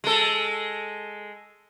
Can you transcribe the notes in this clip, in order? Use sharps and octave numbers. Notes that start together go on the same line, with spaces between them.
G#3 A4